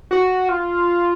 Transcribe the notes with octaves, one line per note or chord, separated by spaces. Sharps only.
F#4
F4